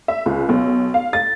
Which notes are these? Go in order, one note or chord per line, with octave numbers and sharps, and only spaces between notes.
E5
C#2
B1
F5
A6